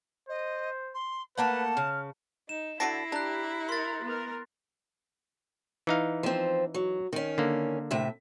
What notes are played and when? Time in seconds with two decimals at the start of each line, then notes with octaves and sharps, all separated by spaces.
0.29 C5 D#5
0.94 C6
1.38 A3 A#3 B4 F#5 A5
1.77 C#3 F6
2.49 D#4 E7
2.80 D3 E4 F#4 A5 A#6 C7 D7
3.12 D4 G4 A#5 F#6
3.69 A#4 C6 A6
4.03 B3 A#4
5.87 E3 D#4 F5
6.23 F3 C4
6.74 F#3
7.13 D#3 C#4
7.38 D3 A#3
7.91 A2 C3 E5